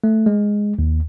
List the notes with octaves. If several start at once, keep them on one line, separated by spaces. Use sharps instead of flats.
A3
G#3
D#2